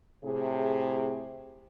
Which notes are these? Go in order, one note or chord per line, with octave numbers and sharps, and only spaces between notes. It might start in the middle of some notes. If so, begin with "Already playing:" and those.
A2 C3 G#4